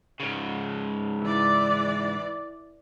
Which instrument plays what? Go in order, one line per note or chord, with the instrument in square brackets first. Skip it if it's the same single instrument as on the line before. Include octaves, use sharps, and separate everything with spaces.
[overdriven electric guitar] G#2 C#3
[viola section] E3 D5